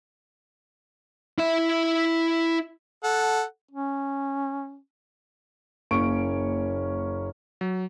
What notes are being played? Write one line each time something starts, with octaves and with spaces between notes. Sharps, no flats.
E4 E5
A4 F#5
C#4
F#1 A#3 C#4 C#5 C#6 D7
F#3